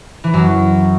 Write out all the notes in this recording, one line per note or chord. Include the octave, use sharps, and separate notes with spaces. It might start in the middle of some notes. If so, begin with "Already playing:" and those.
E3
F#2 F#3